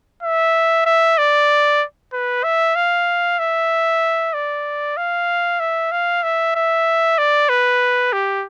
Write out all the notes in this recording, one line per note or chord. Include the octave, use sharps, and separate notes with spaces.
E5
E5
D5
B4
E5
F5
E5
D5
F5
E5
F5
E5
E5
D5
B4
G4